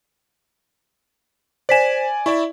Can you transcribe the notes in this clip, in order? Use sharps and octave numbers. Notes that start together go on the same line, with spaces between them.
C5 D5 G#5 B6 E7
E4 D5 E5 C#6